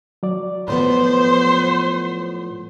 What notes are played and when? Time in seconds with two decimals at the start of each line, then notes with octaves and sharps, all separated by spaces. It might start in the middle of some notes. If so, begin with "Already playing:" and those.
0.23 F#3 D5
0.68 A2 F3 B3 C5